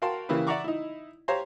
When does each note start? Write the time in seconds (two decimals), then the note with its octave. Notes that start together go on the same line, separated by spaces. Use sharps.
0.02 F#4 A#4 F5 G5 A5 C6
0.29 C#3 E3 A#3 E4 G4 B4
0.47 D5 E5 F#5 A#5 C#6 D6
0.64 D#4 E4
1.28 G4 C5 C#5 F5 A#5 C6